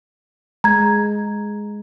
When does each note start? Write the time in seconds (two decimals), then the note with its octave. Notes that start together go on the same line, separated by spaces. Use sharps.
0.64 G#3 A#5 G#6